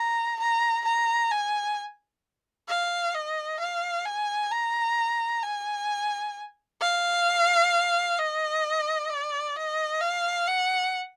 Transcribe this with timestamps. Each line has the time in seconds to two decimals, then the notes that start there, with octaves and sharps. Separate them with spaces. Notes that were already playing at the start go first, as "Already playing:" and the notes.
Already playing: A#5
0.40 A#5
0.85 A#5
1.31 G#5
2.69 F5
3.14 D#5
3.60 F5
4.06 G#5
4.52 A#5
5.43 G#5
6.81 F5
8.19 D#5
9.10 D5
9.56 D#5
10.01 F5
10.48 F#5